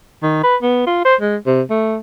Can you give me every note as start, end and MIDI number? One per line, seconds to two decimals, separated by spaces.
0.23 0.40 51
0.43 0.56 71
0.62 0.85 59
0.87 1.02 65
1.05 1.15 72
1.21 1.37 56
1.46 1.62 48
1.70 1.98 57